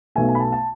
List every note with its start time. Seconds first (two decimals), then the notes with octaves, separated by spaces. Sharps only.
0.15 B1 B2 A3 G#5
0.29 G#5
0.35 B5
0.40 A5
0.53 A5